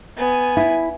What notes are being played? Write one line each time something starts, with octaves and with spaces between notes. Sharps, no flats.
B3 G#5
E4